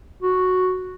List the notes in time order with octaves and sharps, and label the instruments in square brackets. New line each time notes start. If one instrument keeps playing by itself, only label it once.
[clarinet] F#4